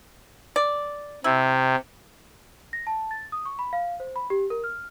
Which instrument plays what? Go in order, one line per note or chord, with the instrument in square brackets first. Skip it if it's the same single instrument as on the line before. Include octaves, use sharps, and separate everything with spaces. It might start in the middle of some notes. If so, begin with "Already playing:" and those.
[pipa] D5
[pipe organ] C3 [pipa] E4
[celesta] A#6
A5
A6
D#6
C#6
B5
F5
C5
B5
G4
A#4
F6